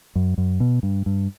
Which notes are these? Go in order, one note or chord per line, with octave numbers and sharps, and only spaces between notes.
F#2
F#2
B2
G2
G2